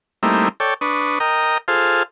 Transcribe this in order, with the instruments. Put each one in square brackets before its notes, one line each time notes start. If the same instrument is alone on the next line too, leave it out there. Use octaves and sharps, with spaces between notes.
[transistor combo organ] G3 A3 A#3 C4 D#4 E4
A4 C#5 D5 G5
D4 B4 C#6 D#6
A#4 D#5 G5 A#5 D#6
F4 G#4 A4 C5 F5